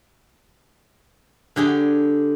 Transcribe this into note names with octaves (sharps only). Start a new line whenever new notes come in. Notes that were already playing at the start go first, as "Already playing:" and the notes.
D3 G4 G#4